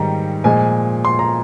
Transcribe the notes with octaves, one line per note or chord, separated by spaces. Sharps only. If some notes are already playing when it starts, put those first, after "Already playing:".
Already playing: G#2 D#3 G3 A#5
A#2 F3 G#3 G#5
C6
A#5